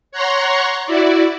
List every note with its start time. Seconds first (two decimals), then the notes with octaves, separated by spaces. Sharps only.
0.12 C#5 F#5 A#5 C6 C#6
0.86 E4 F#4 D5